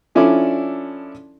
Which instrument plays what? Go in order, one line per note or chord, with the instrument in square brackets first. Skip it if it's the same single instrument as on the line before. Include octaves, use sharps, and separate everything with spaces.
[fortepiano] F3 C#4 D4 E4 A4 D5